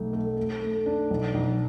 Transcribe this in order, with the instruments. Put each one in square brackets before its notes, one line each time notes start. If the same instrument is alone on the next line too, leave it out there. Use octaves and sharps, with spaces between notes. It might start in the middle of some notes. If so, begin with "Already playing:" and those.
Already playing: [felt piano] B1 A3
A3
A3
A3
D4
B1
B1